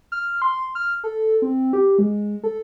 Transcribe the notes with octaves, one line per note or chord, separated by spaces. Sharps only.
F6
C6
F6
A4
C4
G4
G#3
A4